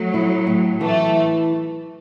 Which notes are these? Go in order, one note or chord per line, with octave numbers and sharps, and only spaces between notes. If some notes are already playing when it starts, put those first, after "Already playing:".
Already playing: F#3 A3
E4
A2
E3 A3